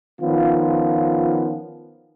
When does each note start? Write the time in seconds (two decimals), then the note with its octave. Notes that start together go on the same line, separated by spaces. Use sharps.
0.22 D#3 F3 B3 C#4 F4